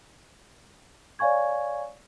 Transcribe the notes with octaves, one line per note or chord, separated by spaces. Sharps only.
C#5 D5 F5 G#5 C#6 G#6